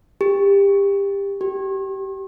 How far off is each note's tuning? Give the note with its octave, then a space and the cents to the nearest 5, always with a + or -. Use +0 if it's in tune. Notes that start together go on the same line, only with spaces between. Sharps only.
G4 +25
G4 -20